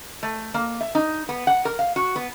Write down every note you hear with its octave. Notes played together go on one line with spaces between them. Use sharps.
A3
A#3
E5
D#4
B3
F#5
A#4
F5
F#4
B3